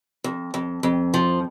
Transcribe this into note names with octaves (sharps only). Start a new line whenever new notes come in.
F2
F2
F2
F3